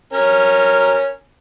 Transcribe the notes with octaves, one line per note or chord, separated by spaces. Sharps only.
C#4 A#4